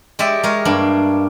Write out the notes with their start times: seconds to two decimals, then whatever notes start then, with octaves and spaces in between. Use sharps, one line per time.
0.19 G#3 G4 D5 E5
0.43 G#3 A#4 C#5
0.65 G2 A#3 D4